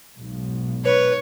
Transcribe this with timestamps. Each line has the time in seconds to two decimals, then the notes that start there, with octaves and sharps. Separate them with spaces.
0.15 B1 G#2
0.85 B4 C#5